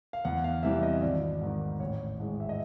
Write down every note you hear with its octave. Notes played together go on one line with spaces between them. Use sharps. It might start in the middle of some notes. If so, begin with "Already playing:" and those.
F5
E2 F#5
F5
C3 E3 G3 E5
D#5
G#1 D5
G#2 D#3
A1 C#5
G#2 E3 G#3
E5
D#5